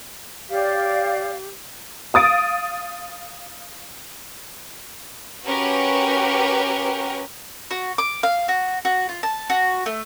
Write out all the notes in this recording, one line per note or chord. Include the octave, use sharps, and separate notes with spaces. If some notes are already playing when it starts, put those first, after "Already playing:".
G4 C#5 D5 F5
F5 D#6 A6 D7
C#4 F#4 G4 A#4 B4
F#4
D6
F5
F#4
F#4
F4
A5
F#4
A3